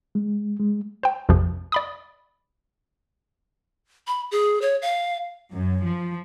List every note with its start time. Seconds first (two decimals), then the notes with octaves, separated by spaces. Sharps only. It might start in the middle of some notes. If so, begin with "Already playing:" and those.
0.15 G#3
0.59 G#3
1.03 C5 G5
1.29 A#1 F2 C3 F3
1.72 D5 B5 D#6
4.07 B5
4.31 G#4
4.61 C#5
4.82 F5
5.52 F#2
5.84 F3